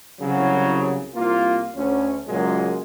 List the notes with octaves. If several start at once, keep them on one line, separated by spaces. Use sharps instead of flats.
C2 C#3 F#3
C2 A#3 F4
D2 C#4
C#2 F#2 A#2 F#3 G#3 A#3